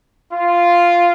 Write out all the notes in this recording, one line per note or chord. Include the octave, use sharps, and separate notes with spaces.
F4